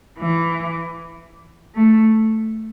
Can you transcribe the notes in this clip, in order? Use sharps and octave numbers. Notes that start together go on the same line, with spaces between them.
E3
A3